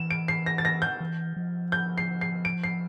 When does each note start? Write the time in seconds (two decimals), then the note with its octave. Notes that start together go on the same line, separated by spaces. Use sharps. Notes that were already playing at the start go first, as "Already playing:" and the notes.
Already playing: E3 E7
0.11 D7
0.28 C7
0.46 A#6
0.58 A6
0.65 A#6
0.82 G6
1.01 E3
1.36 F3
1.72 G6
1.98 C7
2.21 C7
2.45 D7
2.64 C7